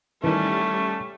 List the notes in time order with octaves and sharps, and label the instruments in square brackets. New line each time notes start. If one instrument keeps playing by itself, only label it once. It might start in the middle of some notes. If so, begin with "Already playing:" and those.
[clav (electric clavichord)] D#3 E3 [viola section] G3 C#4 [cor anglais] A3